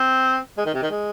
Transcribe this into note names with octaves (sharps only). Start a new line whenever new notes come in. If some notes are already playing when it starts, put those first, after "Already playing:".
Already playing: C4
G#3
D#3
C3
D#3
G#3